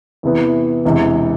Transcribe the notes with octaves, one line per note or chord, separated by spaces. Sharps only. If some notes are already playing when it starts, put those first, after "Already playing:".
E2 C3 E3 B3
E1 E2 C3